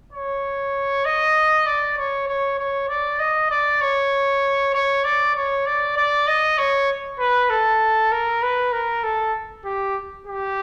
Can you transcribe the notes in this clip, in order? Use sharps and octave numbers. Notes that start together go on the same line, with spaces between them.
C#5
D#5
D5
C#5
C#5
C#5
D5
D#5
D5
C#5
C#5
D5
C#5
D5
D5
D#5
C#5
B4
A4
A#4
B4
A#4
A4
G4
G4